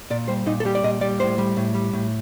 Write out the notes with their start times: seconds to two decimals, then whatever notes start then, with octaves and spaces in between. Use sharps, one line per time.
0.10 A#2 D5
0.28 G3 C5
0.46 A#2 D#4
0.60 A4
0.65 G3 G4
0.75 D5
0.83 A#2 D#5
1.01 G3 D5
1.20 A2 C5
1.38 G3
1.57 A2
1.74 G3
1.93 A2